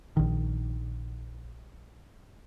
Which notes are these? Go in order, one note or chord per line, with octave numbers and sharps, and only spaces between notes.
A#1 D#3